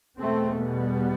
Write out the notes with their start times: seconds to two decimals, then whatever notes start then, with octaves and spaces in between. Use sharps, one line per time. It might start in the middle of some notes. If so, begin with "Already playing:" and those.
0.19 E2 B2 A3 C4
0.59 G3 B3